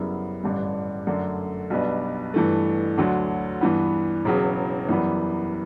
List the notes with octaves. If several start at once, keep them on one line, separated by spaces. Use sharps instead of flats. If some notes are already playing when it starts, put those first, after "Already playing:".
Already playing: F#2 C#3 G3 B3 E4
A1 G2 D3 G3
F#2 D3 A3 D4
B1 B2 G3 B3 D4
G2 E3 A3
D2 D3 F#3
G2 E3 B3
E1 E2 C#3 F#3
F#2 E3 G3 B3